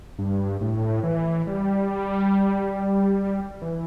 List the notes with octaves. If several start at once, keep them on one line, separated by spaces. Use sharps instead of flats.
G2
A2
E3
G3
E3